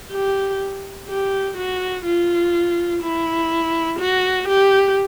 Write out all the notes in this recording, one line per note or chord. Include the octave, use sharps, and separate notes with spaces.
G4
G4
F#4
F4
E4
F#4
G4